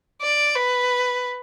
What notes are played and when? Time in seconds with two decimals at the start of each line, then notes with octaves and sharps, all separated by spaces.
0.22 D5
0.56 B4